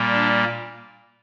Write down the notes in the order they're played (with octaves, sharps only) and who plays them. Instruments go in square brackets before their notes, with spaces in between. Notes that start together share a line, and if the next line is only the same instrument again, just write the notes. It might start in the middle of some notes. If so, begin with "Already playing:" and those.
Already playing: [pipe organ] A#2 G3 A#3
D4